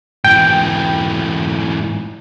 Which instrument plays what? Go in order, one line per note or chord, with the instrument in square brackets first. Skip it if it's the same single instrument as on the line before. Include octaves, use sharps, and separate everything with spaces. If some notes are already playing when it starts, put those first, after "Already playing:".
[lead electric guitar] G#2 E3 [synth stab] G5